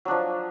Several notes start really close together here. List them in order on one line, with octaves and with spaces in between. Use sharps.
F#3 D4 F3